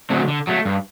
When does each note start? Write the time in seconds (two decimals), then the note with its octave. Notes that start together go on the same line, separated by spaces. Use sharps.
0.10 D3 F#3 A3 C4
0.28 D3
0.47 F#3 A3
0.65 G2